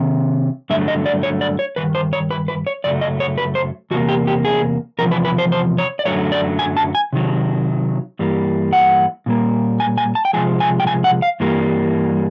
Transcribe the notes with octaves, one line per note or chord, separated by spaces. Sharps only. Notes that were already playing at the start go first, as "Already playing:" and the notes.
Already playing: C3 D#3
G2 D3 F#3 A3 E5
D#5
D5
C#5
D5
C#5
G2 D#3 B4
C5
C#5
B4
B4
C#5
F#2 C#3 F#3 A3 D5
D#5
C#5
B4
C5
E2 C3 A#3 F#4
G4
G4
G#4
E2 C3 F3 A#4
B4
B4
C5
C5
C#5
D5
F#2 D3 F#3 A3 C#5
D5
G#5
A5
G#5
C3 D#3 F#3
G2 E3 G3 A#3
F#5
A#2 G3 A#3
G#5
G#5
A5
G5
C3 F3 G#3 G#5
G#5
G5
G#5
F#5
F5
G2 E3 G3 A#3